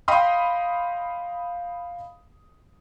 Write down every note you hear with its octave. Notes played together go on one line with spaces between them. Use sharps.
D#5 F5 G5 B5 C6 D#6